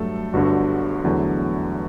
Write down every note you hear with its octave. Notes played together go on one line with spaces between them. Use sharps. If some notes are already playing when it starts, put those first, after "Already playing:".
Already playing: G2 F#3 A3 A4
G1 G2 D3 F#4
E2 D3 F#3 A3